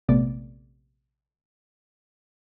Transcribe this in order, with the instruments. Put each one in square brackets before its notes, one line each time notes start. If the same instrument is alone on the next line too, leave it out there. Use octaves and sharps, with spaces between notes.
[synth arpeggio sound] A#1 C3 A3 B3 D5